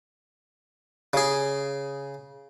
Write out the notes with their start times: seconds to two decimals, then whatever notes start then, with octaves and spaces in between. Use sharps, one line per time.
1.13 C#3 G#4